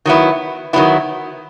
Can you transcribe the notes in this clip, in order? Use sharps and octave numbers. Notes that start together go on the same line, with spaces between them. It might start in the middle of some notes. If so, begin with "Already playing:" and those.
D#3 F#3 B3 E4
D#3 F#3 B3 E4